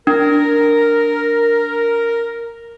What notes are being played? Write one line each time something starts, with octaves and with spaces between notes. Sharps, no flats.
D4 A#4